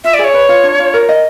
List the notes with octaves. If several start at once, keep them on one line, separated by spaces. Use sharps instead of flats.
F4 E5
G#4 D5
C#5
B4
F4
D4
F4
A#4
D#5